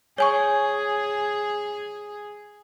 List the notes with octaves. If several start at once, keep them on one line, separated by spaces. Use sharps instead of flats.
G#4 C#5 G#5 C#6